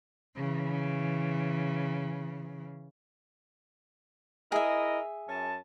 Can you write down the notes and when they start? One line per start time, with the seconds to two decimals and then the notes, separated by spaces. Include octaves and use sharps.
0.37 C#3 E3
4.52 E4 G#4 A#4 D#5 E5
5.29 F#2 C#4 A5